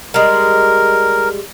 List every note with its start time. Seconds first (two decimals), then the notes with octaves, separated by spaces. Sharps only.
0.14 G3 G#3 A#4